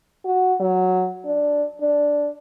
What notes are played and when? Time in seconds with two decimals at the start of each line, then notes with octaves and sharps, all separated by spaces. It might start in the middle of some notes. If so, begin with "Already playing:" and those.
0.25 F#4
0.60 F#3
1.25 D4
1.81 D4